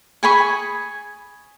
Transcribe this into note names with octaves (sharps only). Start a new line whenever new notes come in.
G#4 G#5 B5 C#6